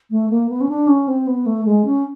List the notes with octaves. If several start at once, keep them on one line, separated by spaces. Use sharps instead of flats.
A3
A#3
B3
C#4
D4
C#4
C4
B3
A3
G#3
C#4